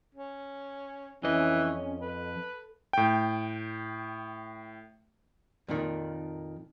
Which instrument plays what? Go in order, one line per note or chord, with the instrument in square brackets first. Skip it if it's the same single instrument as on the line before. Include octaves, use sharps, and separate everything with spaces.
[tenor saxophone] C#4
[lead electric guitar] F2 D#5 [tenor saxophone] E3 [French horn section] C#4
[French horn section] A4 [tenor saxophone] B4
[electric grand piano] A2 G5
[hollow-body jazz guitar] F2 A#2 D#3